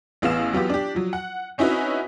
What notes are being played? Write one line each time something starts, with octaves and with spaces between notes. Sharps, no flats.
A1 B3 G#4 F5 E7
F#3 B3 F4 G4
D4 G4
F3 F#3
F#5
C4 C#4 D#4 E4 F#4 B4